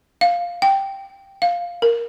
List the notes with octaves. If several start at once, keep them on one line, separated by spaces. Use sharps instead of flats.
F5
G5
F5
A#4